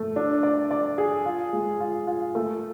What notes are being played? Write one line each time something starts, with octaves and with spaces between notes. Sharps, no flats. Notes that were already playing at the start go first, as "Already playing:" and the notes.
Already playing: A3
D4
D5
D5
G#4
F4
G#3
F4
F4
A3